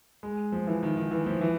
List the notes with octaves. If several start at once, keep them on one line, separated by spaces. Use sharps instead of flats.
G#3
F3
E3
D#3
D#3
E3
F3
E3